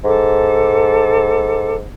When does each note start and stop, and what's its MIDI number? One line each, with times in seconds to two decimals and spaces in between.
0.04 1.90 44
0.04 1.74 69
0.04 1.74 86